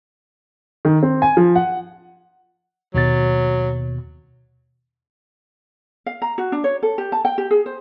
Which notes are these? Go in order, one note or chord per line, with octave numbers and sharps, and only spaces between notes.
D#3
C4
G#5
F3
F#5
D#2 B2 F#3 A6
F5
A#5
F#4
D4
C#5
A4
G4
A5
G5
G4
G#4
C5